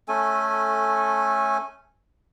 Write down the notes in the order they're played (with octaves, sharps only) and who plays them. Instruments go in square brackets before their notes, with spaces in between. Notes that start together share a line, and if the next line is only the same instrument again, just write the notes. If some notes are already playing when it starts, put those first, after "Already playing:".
[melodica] A3 C#4 A4 G#5